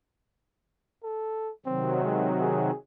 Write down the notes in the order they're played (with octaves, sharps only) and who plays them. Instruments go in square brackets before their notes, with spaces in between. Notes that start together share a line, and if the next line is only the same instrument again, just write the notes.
[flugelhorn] A4
[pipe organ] C3 D#3 F#3 [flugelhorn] C4
[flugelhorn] G#3
G#4